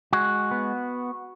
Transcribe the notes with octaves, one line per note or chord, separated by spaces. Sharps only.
G#3 F#4
B3